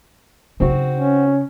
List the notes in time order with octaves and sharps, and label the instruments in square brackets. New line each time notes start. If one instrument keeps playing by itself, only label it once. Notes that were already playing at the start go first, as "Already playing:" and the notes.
[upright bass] C#3 D#4 [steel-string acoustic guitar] C4 F#4
[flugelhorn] C#4